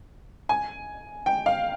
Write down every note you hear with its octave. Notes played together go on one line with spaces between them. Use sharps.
G#5
G5
F5